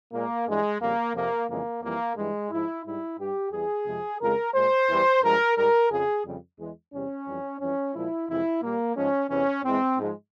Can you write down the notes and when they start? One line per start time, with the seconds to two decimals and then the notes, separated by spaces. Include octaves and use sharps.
0.12 A#2 G#3 A#3
0.47 G2 E3 G3 G#3
0.80 F2 C#3 G3 A#3
1.15 F2 C3 F3 A#3
1.48 F2 C#3 E3 G#3 A#3
1.82 F2 E3 G3 A#3
2.16 G2 E3 G3 G#3
2.50 G#2 F3 G#3 E4
2.84 G#2 G3 E4
3.19 G2 G3 G4
3.52 E2 E3 G3 G#4
3.86 F2 C3 F3 G#3
4.20 F2 C#3 F3 G#3 A#4
4.54 A#2 G#3 C5
4.88 E2 E3 G3
5.23 G2 F3 G#3 A#4
5.56 G#2 G3 A#4
5.90 F2 C#3 F3 G#4
6.24 F2 C#3 G3
6.58 E2 E3 G#3
6.91 E2 C3 G3 C#4
7.26 F2 E3 G3
7.59 F2 E3 G3 C#4
7.94 A#2 F3 G#3 E4
8.28 F2 C3 E3 G#3 E4
8.62 A#2 G3 A#3
8.96 G#2 F3 G#3 C#4
9.30 E2 C3 E3 C#4
9.64 E2 E3 G#3 C4
9.98 G#2 F3 G#3